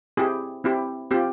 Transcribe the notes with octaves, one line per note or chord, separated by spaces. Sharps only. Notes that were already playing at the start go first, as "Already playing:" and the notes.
C4 E4 G4 G#4
C4 E4 G4
C4 F4 G4